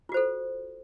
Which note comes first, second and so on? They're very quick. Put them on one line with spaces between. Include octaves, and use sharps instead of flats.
F4 F#4 C5 A4